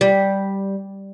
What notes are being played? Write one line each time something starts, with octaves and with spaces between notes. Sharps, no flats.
G3